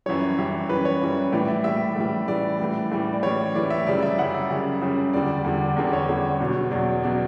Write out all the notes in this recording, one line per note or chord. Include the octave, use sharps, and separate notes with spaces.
F#2 E3 G3 C#5
F#2 E3 G3
F#2 E3 G3 B4
C#5
F#2 E3 G3
A2 E3 G3 D5
E5
A2 E3 G3 E5
A2 E3 G3
A2 E3 G3 D5
A2 E3 G3
A2 E3 G3
D5
A2 E3 G3 C#5
A2 E3 G3 D5
E5
F#2 C#3 G3 D5
E5
F#2 C#3 G3 F#5
E5
F#2 C#3 G3
F#2 C#3 G3
E2 D3 G3 D5
E2 D3 G3
E2 D3 G3
C#5
E2 D3 G3
E2 B2 F#3
E2 B2 F#3 D5
B2 F#3 D5